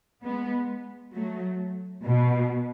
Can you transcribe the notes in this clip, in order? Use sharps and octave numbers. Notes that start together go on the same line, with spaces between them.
G#3 B3
F#3 A3
B2